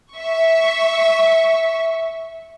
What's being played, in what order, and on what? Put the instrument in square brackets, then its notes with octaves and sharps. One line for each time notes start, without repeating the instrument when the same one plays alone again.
[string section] E5 C#6